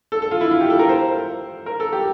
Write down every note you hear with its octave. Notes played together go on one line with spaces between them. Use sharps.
A4
A4
F4
E4
F4
G4
A4
A#4
C5
A#4
A4
G4